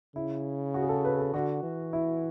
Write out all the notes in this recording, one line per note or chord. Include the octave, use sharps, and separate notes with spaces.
C#3 E4
F#4
G#4
A4
B4
A4
D3 F#4
E3
E4